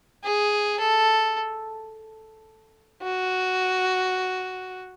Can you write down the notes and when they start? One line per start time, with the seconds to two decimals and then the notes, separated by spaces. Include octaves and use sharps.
0.24 G#4
0.80 A4
3.03 F#4